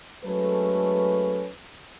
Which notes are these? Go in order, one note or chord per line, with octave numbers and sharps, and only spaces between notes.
F#3 G#3 A3 C#4 A4 B4